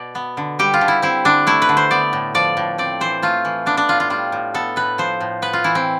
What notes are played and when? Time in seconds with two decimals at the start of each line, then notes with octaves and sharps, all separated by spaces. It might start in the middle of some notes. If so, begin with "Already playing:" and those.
Already playing: B2 D5
0.15 B3
0.37 D3
0.59 G3 G4
0.74 F4
0.81 D3
0.88 E4
1.02 C4 E4
1.25 D3 D4
1.47 A3 E4
1.62 B4
1.69 D3
1.77 C5
1.91 B3 D5
2.13 A2
2.35 F3 D5
2.57 A2
2.78 C4 D5
3.01 E3 C5
3.22 A3 F4
3.45 E3
3.66 B3 D4
3.77 D4
3.88 A2 F4
4.00 F4
4.10 G3 F4
4.32 A2
4.54 B3 A4
4.76 A2 B4
4.98 F3 C5
5.21 A2
5.42 B3 B4
5.53 F4
5.64 E3 E4
5.75 C4